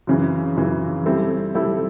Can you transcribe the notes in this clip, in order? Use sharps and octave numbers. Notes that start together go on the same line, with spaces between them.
F#2 C#3 E3
F#2 C#3 E3
G3 C4 E4 A4
G3 C4 E4 A4